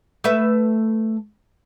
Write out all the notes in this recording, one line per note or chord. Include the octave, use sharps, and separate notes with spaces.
A3 B4 E5